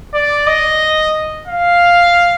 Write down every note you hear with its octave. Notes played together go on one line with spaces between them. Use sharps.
D5
D#5
F5